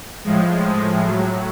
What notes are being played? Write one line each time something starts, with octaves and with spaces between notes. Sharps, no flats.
A2 F3 G#3
G#3
A2 F#3